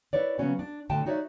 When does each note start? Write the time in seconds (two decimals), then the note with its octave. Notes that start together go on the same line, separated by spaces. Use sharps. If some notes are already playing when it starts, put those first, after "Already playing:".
0.13 E4 B4 C#5 D5
0.38 C#3 F#3 B3 C#4 F#4
0.59 D4
0.89 A2 D3 F#4 G5 A5
1.06 D#4 F#4 C#5 D5 E5